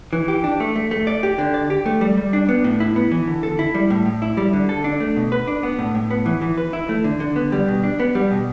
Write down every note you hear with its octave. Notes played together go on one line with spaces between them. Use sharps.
E3
G4
D4
A3
A3
A3
D5
G4
D3
D5
G4
A3
G3
G3
D4
B3
A2
E4
B3
E3
D3
A4
E4
G3
A2
A2
E4
G3
D3
A4
D4
A3
B2
B4
D4
B3
A2
A2
B3
E3
E3
B4
E4
A3
D3
D3
B3
G3
B2
D4
B3
G3
B2